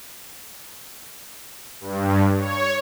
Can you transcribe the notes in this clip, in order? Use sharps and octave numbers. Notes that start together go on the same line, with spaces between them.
G2
C#5